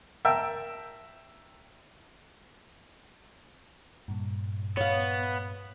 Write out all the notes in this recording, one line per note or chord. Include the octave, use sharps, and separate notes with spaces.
A#4 E5 G5 A5
G2 A#2
B3 C#5 F5